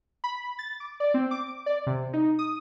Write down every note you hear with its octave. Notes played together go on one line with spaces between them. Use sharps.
B5
A6
D6
D5
C4
D6
D5
C3
D#4
D#6